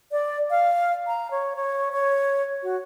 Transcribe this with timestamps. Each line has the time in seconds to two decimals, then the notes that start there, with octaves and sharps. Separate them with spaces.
0.12 D5
0.50 F5
1.07 A#5
1.31 C#5
1.56 C#5
1.92 C#5
2.63 F#4